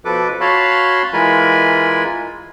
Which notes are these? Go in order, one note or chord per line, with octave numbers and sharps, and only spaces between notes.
B2 F3 A4 B4 D6
F#4 C#5 F5 A5 B5 C6
E3 G#3 F4 A#4 G#5 B5